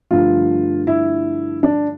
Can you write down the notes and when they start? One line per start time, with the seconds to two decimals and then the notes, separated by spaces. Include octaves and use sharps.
0.11 G2 D3 F3 A3 F4
0.87 E4
1.63 D4